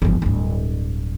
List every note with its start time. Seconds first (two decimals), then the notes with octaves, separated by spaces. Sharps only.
0.02 G1 F3
0.22 D1 G2